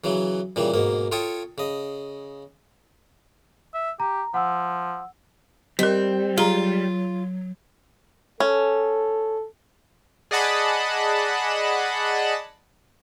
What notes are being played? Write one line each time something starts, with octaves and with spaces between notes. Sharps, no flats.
C#3 E3 F#3
A#2 C#3 E3 G3
G#2 B2 A#3
F4 A4 C#5 G5 D#6
C#3 D#5
E5
G4 A#5
F3 F#5 E6
G3 C4 A#4 D#5
F#3 F4 G#4 A#5
C#4 A4
G#4 D5 D#5 F#5 A5 B5